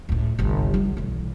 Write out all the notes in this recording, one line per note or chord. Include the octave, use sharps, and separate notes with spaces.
C#2 A2
G1 C2
G3 F4
B1 E3